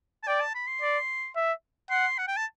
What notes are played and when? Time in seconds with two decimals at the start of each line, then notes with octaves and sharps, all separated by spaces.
0.23 A5
0.27 D5 G5
0.41 A5
0.55 B5
0.67 C6
0.82 D5
1.36 E5
1.90 F#5 C6
2.18 F#5
2.28 G5
2.37 A5